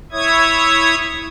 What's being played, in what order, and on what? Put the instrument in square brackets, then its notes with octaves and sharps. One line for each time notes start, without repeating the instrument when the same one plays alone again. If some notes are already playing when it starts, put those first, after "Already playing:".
[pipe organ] E4 C#5 E5 D#6 G#6